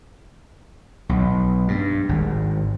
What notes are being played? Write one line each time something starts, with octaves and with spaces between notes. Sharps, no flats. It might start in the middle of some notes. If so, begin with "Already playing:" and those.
B1
G2
G#1